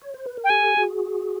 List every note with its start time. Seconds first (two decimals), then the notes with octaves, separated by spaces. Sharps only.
0.02 C#5
0.14 C5
0.26 B4
0.37 A#4
0.44 G5
0.49 G4 A4 G#5
0.77 F#4 G#4